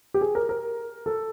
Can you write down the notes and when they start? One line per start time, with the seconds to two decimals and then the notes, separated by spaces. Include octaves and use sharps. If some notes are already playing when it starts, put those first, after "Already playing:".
0.14 G4
0.21 G#4
0.35 A#4
0.49 A#4
1.06 A4